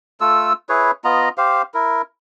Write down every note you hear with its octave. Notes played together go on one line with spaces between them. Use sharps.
A3 F4 A4 E6
E4 G#4 B4 C#5
B3 F4 D#5 A#5
G4 C5 F5
E4 A#4